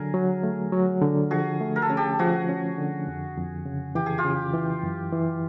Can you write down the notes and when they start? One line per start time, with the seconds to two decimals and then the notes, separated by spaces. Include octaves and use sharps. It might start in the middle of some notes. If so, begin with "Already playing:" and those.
Already playing: D3 F#3 G#4 A#4
0.14 F#3
0.43 A3
0.72 F#3
1.02 D3
1.31 F3 F#4 G#4
1.61 A3
1.76 A#4
1.82 A4
1.90 C#4 G#4
1.97 G4 A4
2.19 F3 F#4 G#4
2.49 C#4
2.78 D3
3.08 F2
3.37 F2
3.66 C#3
3.95 E3 G4
4.06 G#4
4.18 F4 G4
4.25 C#3
4.54 E3
4.83 F#2
5.12 E3